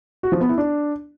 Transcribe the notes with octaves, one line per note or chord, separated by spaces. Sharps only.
F#4
F3
B3
E4
D4